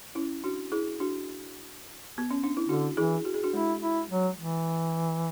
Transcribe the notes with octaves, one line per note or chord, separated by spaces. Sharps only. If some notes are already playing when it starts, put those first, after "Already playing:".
C#4 E4
D4 F#4
E4 G#4
D4 F#4
B3
C#4
D4
E4
D3 D4 F#4
E3 E4 G#4
F#4
G#4
D4 F#4
G#3 E4
E4
F#3
E3